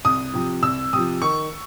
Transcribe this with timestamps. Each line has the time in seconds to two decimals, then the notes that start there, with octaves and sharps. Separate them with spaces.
0.05 C2 D#6
0.34 C3 F3
0.63 C2 E6
0.93 C3 F3 D#6
1.22 D#3 C#6